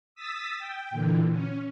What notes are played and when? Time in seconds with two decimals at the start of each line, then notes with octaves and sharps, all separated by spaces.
0.15 D#6 E6 A6 B6
0.58 G5
0.91 A#2 D3 E3
1.31 C#4